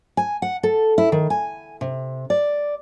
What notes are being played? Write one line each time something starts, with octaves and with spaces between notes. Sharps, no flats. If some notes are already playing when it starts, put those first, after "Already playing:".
G#5
F#5
A4
E4
D#3
G#5
C3
D5